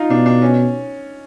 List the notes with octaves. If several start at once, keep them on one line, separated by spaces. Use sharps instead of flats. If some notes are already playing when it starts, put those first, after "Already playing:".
Already playing: D#4 F4
B2 D4
D4
C#4